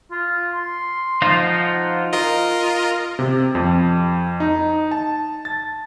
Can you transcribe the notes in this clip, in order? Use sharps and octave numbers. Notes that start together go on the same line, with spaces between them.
F4
C6
F3 D#4 F4
F#5
F4 A#4 D#5
C3
F2
D#4
A5
A6